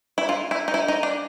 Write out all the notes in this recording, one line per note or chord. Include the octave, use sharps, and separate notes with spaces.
E4
F4
E4
D#4
E4
D#4
D4